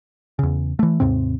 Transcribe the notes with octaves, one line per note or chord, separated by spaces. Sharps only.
E2 C#3
E3 A3
D#2 G#2 C3 C4